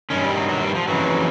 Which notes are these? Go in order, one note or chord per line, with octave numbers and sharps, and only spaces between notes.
G2 D#3 C#4
G3
F#3
F#3
G3
F3
F2 C#3 E3 F#3